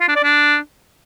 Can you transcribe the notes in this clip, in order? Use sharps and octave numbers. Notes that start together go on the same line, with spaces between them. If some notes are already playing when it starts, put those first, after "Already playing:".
F4
D4
D5
D4